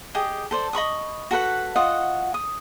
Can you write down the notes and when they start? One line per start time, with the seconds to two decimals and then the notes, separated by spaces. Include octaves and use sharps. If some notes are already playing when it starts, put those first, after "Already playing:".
0.15 G4 G#4 D#5
0.51 A4 C5 D5
0.73 D#5 B5 C#6 D#6
1.31 F#4 A4 B4 F#5
1.76 F4 F#4 D#5 F#5
2.34 D#6